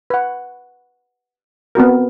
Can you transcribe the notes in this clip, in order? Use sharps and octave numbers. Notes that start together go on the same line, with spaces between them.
B4 F#5
B3 C4 F#4 A#4